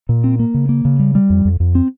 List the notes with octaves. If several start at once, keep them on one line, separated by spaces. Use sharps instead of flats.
A#2
C4
A#3
C#3
A#3
C#3
G3
G3
F2
F2
F2
C4